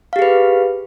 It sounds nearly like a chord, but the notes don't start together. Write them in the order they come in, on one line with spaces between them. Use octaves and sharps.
F5 G4 G#4 B4